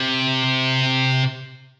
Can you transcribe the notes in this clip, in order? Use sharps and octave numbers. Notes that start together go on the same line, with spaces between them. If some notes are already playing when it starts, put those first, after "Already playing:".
Already playing: C3